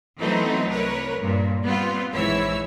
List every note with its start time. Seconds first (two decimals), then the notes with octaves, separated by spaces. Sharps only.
0.20 E3 F#3 A3 B3 C4 D#4
0.68 C2 A#4 B4 C#5
1.20 G2 A#2
1.63 G3 B3 C4 F4
2.11 A#1 G#2 E3 E4 C#5 E6